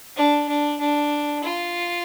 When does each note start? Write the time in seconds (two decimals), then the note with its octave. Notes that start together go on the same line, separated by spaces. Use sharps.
0.16 D4
0.48 D4
0.80 D4
1.44 F4